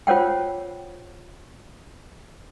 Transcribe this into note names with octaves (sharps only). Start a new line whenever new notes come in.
F4 C5 C#5 F#5 G5